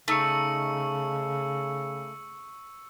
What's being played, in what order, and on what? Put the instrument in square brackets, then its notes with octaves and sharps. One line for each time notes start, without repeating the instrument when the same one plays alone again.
[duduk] C#3 [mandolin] A3 D#4 [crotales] C#6 E6 C#7